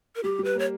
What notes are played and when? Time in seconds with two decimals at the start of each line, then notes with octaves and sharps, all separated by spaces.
0.16 A#4
0.24 G3 G4
0.39 G3
0.44 B4
0.55 A#3 C#5